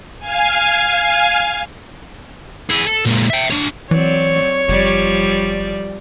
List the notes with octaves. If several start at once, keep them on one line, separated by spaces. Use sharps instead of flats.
F5 G#5
E4 G#4
A4
A#2 G#3
E5 G5
D4 C#5
E3 F#3 C4 C#5 D5
F#1 F3 G3 D5